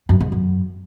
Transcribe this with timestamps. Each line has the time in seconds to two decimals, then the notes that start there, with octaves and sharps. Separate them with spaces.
0.09 F#2
0.20 G#2
0.32 F#2